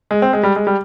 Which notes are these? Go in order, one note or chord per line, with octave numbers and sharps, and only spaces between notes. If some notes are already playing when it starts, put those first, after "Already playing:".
G#3
C4
G#3
G3
G#3
G3